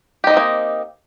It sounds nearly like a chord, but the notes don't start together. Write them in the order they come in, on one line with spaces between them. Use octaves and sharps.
G4 D#4 D#5 C4 A#3